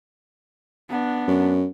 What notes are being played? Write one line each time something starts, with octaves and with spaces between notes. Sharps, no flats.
B3 D4
F#2